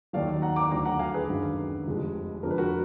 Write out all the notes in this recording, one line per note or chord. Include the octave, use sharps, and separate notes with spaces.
D#2 D#3 F#3 D5 F5
F#5 A#5
A#5 D6
D2 D3 F#3 A#5 D6
F#5 A#5
F5 G#5
G#4 B4
G#1 F#2 D3 F#3
F1 F2 F3 G#3
F2 D3 G#3 A#4
B4
F#4 A#4